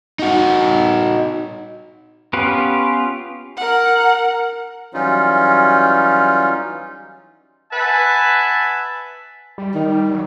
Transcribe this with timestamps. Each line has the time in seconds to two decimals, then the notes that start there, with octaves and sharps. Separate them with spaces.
0.19 D#4 F#4
2.33 B3 C#4 F4 G4 B4
3.57 A#4 F#5
4.94 E3 F#3 G3 C#4 D#4 F4
7.73 B4 E5 F#5 G#5 A5
9.58 G3
9.75 D#3
10.11 F#3